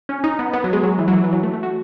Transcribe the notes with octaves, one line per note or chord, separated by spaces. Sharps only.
C#4
D#4
B3
B3
F#3
G#3
F#3
E3
F#3
E3
E3
F#3
A3
A3
F#4